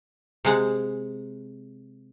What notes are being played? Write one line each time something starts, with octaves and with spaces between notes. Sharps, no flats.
C3 G#3 F#5